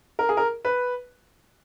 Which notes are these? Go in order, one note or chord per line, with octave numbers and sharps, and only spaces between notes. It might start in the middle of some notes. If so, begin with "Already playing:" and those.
A#4
G#4
A#4
B4